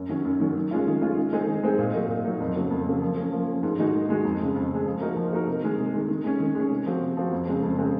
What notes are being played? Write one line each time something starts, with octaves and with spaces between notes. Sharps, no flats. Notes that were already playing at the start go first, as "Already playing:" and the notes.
Already playing: F#2
D#3 F#3 C#4
F#2
D#3 F#3 C#4
D#3
G#3 C#4 F4
D#3
G#3 C#4 F4
D#3
G#3 C4 D#4 G#4
D#3
G#3 C4 D#4 G#4
A#2
F#3 A#3 D#4
A#2
F#3 A#3 D#4
F2
C#3 F#3 A#3
F2
C#3 F#3 A#3
F3
A#3 C#4
F3
A#3 C#4
G#2
D#3 G#3 D#4 F#4
G#2
D#3 G#3 D#4 F#4
F2
C#3 G#3
F2
C#3 G#3
F3
A#3 D#4 F#4 A#4
F3
A#3 D#4 F#4 A#4
C3
D#3 G#3
C3
D#3 G#3
D#3
G#3 C#4
D#3
G#3 C#4
C3
F3 C4 F#4
C3
F3 C4 F#4
F2
C#3 G#3 C4
F2
C#3 G#3 C4